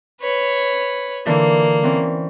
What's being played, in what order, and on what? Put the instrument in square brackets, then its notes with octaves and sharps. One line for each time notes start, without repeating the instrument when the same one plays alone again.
[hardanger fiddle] B4 C#5
[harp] D3 E3 F4 [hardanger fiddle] A#3
[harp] E3 C4 C#4